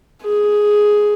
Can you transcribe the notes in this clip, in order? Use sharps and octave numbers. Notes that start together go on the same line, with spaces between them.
G#4